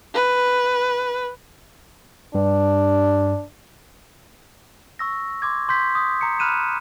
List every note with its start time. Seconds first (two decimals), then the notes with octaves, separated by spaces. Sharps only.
0.15 B4
2.35 G2 D4
4.99 C#6 E6 A#6
5.42 C6 D6 G#6
5.69 C6 G6 B6
5.95 D#6
6.21 A#5 C#7
6.39 B5 F6 F#6 D#7 E7